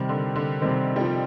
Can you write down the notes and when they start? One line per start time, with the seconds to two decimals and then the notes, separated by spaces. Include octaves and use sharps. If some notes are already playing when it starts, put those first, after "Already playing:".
Already playing: C3 D#3 G3 C4
0.09 D3
0.36 D3
0.62 C3 D#3 G3 C4
0.96 G3
1.01 F3